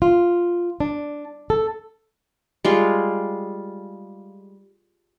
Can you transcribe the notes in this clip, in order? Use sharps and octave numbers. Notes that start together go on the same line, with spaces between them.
F4
D4
A4
G3 G#3 F4